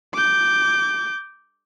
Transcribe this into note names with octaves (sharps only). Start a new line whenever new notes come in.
D6 G6